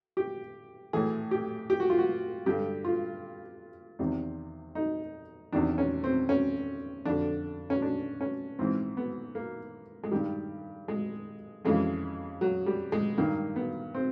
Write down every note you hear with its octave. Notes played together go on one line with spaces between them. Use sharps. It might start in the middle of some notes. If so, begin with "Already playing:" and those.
G4
A2 E3 G#4
G4
G4
F#4
F4
F#4
G2 D3 G4
F4
E2 C3 D#3
D#4
E2 C3 D#3 D4
C#4
C4
C#4
F2 D3 D4
C#4
D4
C#4
G#2 E3 C4
B3
A#3
G#3
G2 D#3 G3
G#3
F2 C#3 E3 G#3
F#3
G3
G#3
G2 D#3 A#3
B3
C4